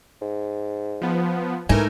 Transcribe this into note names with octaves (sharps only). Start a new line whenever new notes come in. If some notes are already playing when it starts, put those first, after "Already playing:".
G#2
F3 B3
G#2 E3 A3 D#4 A#4 G#5